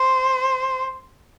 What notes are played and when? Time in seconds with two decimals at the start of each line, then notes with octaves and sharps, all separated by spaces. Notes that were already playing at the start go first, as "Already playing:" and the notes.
Already playing: C5